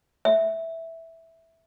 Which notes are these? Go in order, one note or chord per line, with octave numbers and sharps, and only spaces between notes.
E5